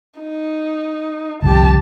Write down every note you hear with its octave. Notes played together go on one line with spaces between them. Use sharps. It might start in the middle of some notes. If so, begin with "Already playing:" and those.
D#4
G1 C2 F2 G4 A5